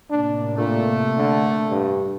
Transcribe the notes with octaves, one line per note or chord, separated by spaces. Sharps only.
A2 C3 A#3 D4
A#2 A3
D3
G2